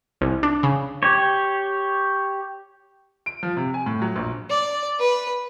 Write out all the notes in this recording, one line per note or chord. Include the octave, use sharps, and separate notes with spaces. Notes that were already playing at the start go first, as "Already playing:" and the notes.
C2
D4
C#3
G4 C#5
D7
F3
C3
G#5
A2
F#3
A#1
D5
B4